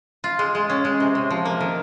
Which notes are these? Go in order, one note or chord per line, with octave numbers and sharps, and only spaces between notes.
F4
G#3
G#3
C#4
G#3
C3
C3
F3
A#3
D#3